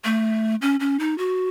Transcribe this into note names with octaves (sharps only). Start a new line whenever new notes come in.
A3
C#4
C#4
D#4
F#4